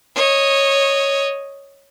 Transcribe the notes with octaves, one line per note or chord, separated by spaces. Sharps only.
C#5 D#5